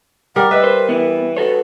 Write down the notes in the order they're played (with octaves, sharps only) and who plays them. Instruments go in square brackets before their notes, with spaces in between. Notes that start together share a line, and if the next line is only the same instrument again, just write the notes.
[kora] G3 [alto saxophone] A#4 [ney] F#5
[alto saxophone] B4 [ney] D#5 [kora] E5
[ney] A#4 [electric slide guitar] C5
[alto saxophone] E3 [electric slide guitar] B3
[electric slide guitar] F#4 A4 C#5 [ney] B4